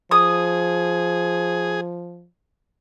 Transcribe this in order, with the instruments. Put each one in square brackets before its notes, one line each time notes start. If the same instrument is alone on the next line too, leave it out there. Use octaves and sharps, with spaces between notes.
[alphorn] F3 [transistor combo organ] G#4 [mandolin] D#6